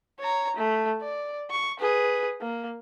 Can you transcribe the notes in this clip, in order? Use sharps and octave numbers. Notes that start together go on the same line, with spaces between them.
C#5 A#5
A3
D5
C#6
G#4 B4
A#3